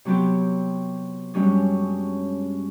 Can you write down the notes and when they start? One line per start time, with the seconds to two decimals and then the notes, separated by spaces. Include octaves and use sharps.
0.05 C3 F#3 B3 C4 G4
1.34 F#2 G3 G#3 C#4 D4